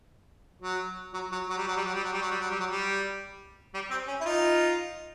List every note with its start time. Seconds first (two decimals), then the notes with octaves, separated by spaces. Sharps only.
0.62 F#3
1.13 F#3
1.32 F#3
1.49 F#3
1.57 G3
1.67 F#3
1.77 G3
1.85 F#3
1.94 G3
2.04 F#3
2.13 G3
2.22 F#3
2.31 G3
2.40 F#3
2.50 G3
2.59 F#3
2.70 G3
3.74 G3
3.90 C4
4.08 C#4
4.21 E4
4.25 D#4 F4